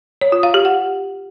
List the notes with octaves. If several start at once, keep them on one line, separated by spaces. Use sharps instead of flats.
C#5
F4
F5
G4
F#5